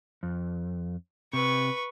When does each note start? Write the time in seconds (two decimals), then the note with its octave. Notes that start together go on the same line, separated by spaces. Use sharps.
0.23 F2
1.33 C3 B4 C#6